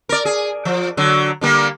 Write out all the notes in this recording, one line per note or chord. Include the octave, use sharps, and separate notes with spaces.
A#4 D5
G#4
F3
D3 F#3
D3 G3 A#3